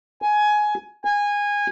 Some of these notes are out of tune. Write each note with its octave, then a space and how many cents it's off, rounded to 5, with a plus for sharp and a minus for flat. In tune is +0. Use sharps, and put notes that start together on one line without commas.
G#5 +15
G#5 -20